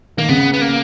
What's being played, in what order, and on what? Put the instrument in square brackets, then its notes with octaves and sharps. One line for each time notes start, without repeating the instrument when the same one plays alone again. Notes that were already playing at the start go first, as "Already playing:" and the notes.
[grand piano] D#3 [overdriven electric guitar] A#3
[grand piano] C#3 [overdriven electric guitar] B3
[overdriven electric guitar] B3
A#3